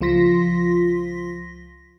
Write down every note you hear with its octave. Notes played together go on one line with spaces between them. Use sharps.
C#2 F3 F4 C6 A#6 B6